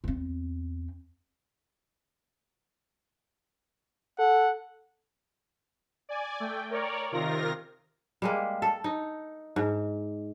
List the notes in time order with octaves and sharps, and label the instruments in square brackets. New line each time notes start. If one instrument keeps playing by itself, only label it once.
[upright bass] E2 C4
[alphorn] A4 [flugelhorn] F#5
[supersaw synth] D5 G#5
A3 G5
A#4 C#5 D5
C3 D#3 F4 A#4 A#6
[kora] G3 G#3 A#3
A4
D#4
G#2